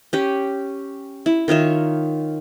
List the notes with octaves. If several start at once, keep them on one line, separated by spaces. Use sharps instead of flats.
C#4 G4
E4
D#3 F4 C#5 E5